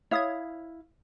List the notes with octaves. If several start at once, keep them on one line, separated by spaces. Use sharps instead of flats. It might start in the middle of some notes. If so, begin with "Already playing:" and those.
E4 C#5 F5 D#6 G#6